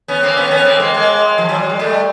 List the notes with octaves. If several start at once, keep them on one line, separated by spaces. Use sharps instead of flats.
B3 C#4
A#3 C4
B3 C#4
C4
B3 C#4
A#3 C4
G#3 A#3
G#3 A#3
F3
F#3
G3
G#3
G3 A3